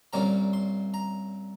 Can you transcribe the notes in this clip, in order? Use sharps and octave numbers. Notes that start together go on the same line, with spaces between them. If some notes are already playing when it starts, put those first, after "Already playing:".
C2 A#2 G3 A#3 C#4 A#5
C6
A#5